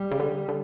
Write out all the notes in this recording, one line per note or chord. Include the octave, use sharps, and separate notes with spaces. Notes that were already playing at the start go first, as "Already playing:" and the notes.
Already playing: G3
C#3
D3
D3